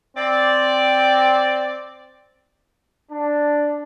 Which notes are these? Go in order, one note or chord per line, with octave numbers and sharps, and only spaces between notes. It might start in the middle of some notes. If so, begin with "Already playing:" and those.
C4 D5
D4